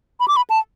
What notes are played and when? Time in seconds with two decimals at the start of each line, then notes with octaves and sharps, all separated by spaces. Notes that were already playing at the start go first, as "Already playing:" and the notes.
0.20 B5
0.28 D6
0.37 B5
0.50 A5